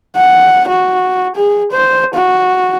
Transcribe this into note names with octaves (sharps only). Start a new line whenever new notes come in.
F#5
F#4
G#4
C5
F#4